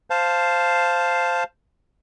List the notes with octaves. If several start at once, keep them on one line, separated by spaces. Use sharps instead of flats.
C5 F5 A5